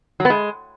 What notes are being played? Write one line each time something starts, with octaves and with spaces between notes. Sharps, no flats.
F#3
B3
G#3